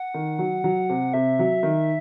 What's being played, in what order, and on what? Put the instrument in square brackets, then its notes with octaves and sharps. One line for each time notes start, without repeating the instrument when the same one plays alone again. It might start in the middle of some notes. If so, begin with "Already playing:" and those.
Already playing: [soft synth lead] F#5
[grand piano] D#3
F#3
F#3
C3
[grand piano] C3 [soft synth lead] E5
[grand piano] F#3
D#3